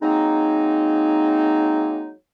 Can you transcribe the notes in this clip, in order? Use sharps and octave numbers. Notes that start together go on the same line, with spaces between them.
F#3 G#3 A#3 C4 D#4